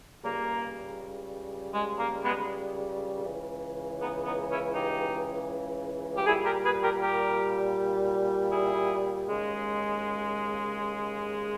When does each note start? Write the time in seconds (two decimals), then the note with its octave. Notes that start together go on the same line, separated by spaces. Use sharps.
0.23 C#2 C#3 G3 A#3
1.74 G#3
1.99 A#3
2.24 G#3 B3
3.24 C#2 C#3 E3
4.00 B3 D#4
4.24 B3 D#4
4.50 C#4 E4
4.75 D#4 G4
6.16 G4
6.25 A#2 G3 E4 G#4
6.44 G4 A#4
6.64 G#4 B4
6.83 G4 A#4
7.01 G4 A#4
8.51 E4 G#4
9.28 D#2 C#3 G#3